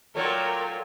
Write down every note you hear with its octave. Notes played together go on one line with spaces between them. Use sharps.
A#2 F#3 A3 A#4 C#5 G5